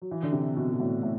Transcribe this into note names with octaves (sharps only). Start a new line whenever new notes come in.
F#3
E3
D3
C3
B2
B2
A2
A2